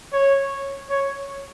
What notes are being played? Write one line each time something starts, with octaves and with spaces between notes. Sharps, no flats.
C#5
C#5